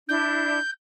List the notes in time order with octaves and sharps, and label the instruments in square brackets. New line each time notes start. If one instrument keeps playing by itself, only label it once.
[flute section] D4 E4 [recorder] G6